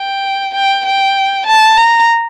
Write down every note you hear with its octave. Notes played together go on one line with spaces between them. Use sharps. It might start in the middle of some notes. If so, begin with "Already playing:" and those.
Already playing: G5
G5
G5
A5
A#5